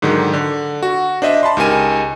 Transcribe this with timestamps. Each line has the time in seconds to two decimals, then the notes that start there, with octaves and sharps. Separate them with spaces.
0.02 G#2 D3 D#3 F#3
0.33 D3
0.83 F#4
1.22 D4 C5 D#5 E5
1.43 A5 B5 C6
1.57 C#2 D#4 G4 A#4 G#5 D#7